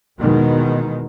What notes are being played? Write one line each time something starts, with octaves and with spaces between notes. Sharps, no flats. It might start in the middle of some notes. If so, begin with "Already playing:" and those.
E2 B2 D#3 G#3